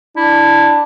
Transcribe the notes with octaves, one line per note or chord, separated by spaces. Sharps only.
D4 E4